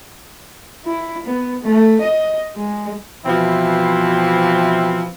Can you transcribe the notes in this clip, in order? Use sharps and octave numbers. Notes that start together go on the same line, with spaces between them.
E4
B3
A3
D#5
G#3
B2 E3 F3 C4 E4